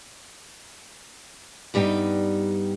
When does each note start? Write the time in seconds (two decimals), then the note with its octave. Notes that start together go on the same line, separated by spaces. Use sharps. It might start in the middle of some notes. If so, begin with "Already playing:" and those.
1.74 G2 G3 B3 D#4 G5